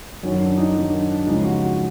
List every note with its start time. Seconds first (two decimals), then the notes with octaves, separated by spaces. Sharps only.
0.23 F#2 D#3 F#3
0.40 D4
0.58 D#4
0.75 F#2 D#3 F#3 D4
0.92 D4
1.10 D4
1.27 C#2 C#3 F3 D#4
1.44 F#4
1.62 F#4